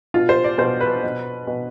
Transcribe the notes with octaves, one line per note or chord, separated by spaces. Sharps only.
B2 F4
C5
D5
B2 C5
B4
B2
B2